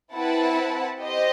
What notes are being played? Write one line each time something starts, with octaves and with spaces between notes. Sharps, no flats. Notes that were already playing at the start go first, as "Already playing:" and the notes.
C4 E4 B4 F#5 A5
G4 C5 D#5